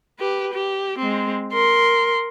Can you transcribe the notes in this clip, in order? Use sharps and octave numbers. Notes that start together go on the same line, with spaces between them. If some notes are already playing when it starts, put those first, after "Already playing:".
G4 B4
G4
G#3 C4
A#4 C6